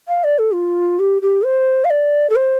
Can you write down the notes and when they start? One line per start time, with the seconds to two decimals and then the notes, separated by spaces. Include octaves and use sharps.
0.08 F5
0.24 D5
0.39 A4
0.54 F4
0.99 G4
1.22 G4
1.45 C5
1.85 F5
1.90 D5
2.30 A4
2.36 C5